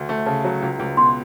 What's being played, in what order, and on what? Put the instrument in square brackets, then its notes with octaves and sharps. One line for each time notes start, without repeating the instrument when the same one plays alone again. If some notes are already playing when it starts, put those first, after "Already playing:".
Already playing: [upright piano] D2
A3
[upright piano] C#3 [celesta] A5
[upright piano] F#3
C#2
C#2
[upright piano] B2 [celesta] C6